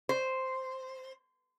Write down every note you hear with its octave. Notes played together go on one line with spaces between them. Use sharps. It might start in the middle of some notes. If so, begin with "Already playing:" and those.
C5